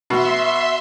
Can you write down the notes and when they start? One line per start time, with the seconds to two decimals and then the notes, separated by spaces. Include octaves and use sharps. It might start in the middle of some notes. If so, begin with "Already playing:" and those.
0.10 B2 B3 E5 C6